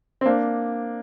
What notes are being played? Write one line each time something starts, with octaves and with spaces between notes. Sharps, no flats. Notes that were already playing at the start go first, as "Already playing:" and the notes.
C4
A#3 D4